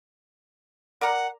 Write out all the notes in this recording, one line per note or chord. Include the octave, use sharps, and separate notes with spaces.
A#4 D5 F#5 A#5